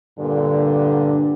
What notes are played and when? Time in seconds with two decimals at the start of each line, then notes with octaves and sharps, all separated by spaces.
0.19 G2 A#2 D3